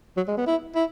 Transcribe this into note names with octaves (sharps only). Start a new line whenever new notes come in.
F#3
G#3
B3
E4
E4